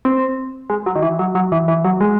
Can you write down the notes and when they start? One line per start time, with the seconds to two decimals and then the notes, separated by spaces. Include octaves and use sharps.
0.05 C4
0.70 G#3
0.86 F#3
0.95 D#3
1.02 E3
1.19 F#3
1.35 F#3
1.52 E3
1.68 E3
1.84 F#3
2.01 G#3